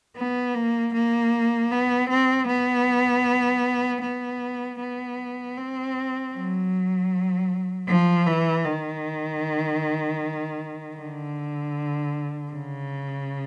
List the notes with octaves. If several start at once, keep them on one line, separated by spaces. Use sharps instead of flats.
B3
A#3
A#3
B3
C4
B3
B3
B3
C4
F#3
F3
E3
D#3
D3
C#3